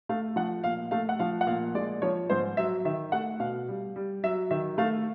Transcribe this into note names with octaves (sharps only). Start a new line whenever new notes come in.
A3 F5
F3 F#5
A#2 F5
A3 F5
F#5
F3 F5
F#5
A#2 F5
G#3 D5
F3 C#5
G#2 C5
F#3 E5
D#3 E5
A3 F#5
B2 F5
G3
G3
F#3 E5
D#3 E5
A3 F5